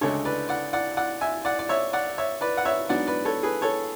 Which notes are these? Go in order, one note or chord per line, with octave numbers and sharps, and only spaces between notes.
D2 C#3 G#3 D4 A4 C#5
B4 D5
D5 F#5
D5 F#5
D5 F#5
E5 G#5
D5 F#5
D5
C#5 E5
D5 F#5
C#5 E5
B4 D5
F#5
C#5 E5
G#2 F#3 B3 D4 D5 F#5
B4 D5
A4 C#5
G#4 B4
A4 C#5